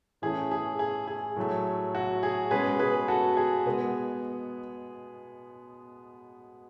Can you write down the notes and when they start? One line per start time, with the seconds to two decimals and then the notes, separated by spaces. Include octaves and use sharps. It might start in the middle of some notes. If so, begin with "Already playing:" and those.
0.22 A2 E3 A3 C#4 G#4
0.51 G#4
0.79 G#4
1.07 G#4
1.36 A2 F#3 A3
1.95 F#4
2.23 G#4
2.51 B2 G#3 C#4 G#4 B4
2.79 G#4 B4
3.08 F#4 A4
3.37 G#4
3.66 B2 G#3 B3